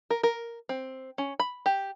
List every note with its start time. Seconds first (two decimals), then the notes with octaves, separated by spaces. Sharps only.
0.10 A#4
0.23 A#4
0.69 C4
1.18 C#4
1.39 B5
1.66 G4